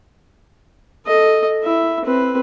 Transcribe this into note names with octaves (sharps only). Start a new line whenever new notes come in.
A4 D#5
E4 E5
C4 B4